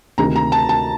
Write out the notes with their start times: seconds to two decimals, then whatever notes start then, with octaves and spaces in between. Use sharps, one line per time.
0.18 D2 C3 D#3 A#5
0.36 A#5
0.52 A5
0.69 A5